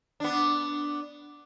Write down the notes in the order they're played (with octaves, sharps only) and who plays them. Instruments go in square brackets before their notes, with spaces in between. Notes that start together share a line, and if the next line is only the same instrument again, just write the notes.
[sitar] B3 D4